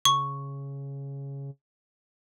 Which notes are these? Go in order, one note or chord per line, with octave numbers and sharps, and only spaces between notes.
C#3 C#6